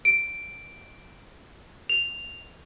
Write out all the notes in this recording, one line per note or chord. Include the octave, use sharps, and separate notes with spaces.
D7
F7